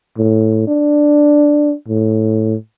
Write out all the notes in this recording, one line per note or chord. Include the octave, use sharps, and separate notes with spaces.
A2
D4
A2